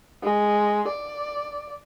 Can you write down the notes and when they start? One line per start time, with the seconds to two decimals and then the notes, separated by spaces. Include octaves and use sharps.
0.24 G#3
0.88 D5